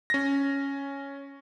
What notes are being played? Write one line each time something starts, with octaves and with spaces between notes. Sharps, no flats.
C#4 A#6